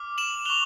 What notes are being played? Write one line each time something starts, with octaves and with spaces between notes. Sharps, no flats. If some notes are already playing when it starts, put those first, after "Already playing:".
Already playing: D6 F6
E7 F#7
C#6 F#6 F7 G7